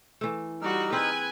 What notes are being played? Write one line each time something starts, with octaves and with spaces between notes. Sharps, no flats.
E3 A3
G3 D#4 F#4 E6 F6
C4 G#4 B4 G#5